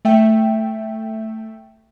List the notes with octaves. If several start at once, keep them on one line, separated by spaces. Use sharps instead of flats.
A3 E5 G5